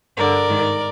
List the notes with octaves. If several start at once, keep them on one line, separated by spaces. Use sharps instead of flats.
G2 D3 A#4 D5
G#2 D#3